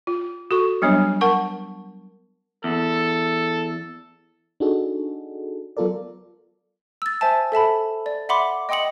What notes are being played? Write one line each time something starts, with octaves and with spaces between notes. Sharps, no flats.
F4
F#4 A4 C#6
F#3 G3 B3 D4 C#5
A#4 F#5 A5 C#6
E2 A4
D4 D#4 F#4 G#4 A4
F#3 B3 F4 A4 A#4 D5
E6 A6
C5 E5 G#5 A5
A4 E5 A5 B5
D5
E5 F#5 B5 C6 D6
D#5 G5 C6 D#6 C#7 F#7